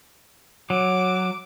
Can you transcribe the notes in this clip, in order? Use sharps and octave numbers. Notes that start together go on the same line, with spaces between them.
F#3 D6